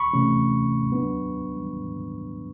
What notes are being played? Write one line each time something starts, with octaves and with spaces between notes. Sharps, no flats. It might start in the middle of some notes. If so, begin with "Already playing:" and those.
Already playing: B5 C#6
C3 E3 A3 C#4
F#3 B3 D4